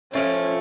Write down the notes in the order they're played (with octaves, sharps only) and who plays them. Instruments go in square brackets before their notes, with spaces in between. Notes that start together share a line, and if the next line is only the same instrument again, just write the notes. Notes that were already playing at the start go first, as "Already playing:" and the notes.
[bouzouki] F3 A3 C4 [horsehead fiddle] C#4